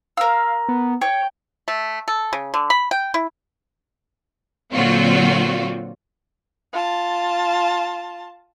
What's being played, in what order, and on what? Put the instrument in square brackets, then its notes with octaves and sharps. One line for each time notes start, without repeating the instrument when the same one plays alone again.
[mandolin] A#4 E6 [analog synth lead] F5
[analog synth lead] B3
[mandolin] C#5 [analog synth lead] G5
[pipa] A3
A4
C#3
D3
B5
G5
E4
[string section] A#2 D3 F#3 C4 F4 F#4
[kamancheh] F4 A5